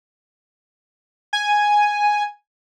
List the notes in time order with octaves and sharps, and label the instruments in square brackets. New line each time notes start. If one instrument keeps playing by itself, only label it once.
[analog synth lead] G#5